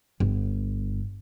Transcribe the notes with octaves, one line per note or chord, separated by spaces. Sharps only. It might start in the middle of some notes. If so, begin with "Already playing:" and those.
G1